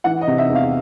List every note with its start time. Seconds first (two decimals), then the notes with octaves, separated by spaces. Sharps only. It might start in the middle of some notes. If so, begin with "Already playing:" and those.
0.04 E3 F#5
0.21 D#5
0.27 C3
0.38 E5
0.50 E2
0.55 F5